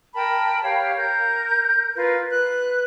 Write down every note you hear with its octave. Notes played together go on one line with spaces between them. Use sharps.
A#4 G5 A5 B5
G4 C#5 F5 G5
A#4 G6
F4 A#4 B4
B4 F#6